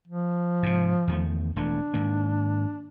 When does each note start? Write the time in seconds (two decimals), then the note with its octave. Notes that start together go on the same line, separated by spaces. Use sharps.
0.08 F3
0.63 G#2 C3
1.08 E2 D#3 A3
1.56 E1 E3 A3 D4
1.94 G#2 D#3 A#3